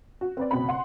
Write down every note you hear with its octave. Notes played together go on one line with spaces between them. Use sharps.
F#4
C4 B4 D5
F#1 B2 C4 B5
F#5 C6